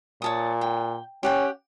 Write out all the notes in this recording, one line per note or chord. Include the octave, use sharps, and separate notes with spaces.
A#2 C#5 A5 D#6
G5
C#4 G4 F#5 G5